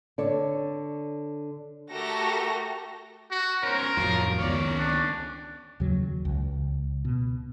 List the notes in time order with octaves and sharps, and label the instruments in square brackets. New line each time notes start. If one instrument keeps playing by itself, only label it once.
[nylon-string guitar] D3 C#5 D5
[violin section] A3 F#4 G4 A4 A#4 A#6
[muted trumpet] F#4
[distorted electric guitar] C#4 C5 [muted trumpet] A#4
[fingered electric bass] D1 F2 [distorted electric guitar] F#3 F4
[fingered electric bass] C#2 D#3 B3 [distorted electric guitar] C#4 D5
[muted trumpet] D4
[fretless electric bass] D#2 C#3 F#3
C#2
B2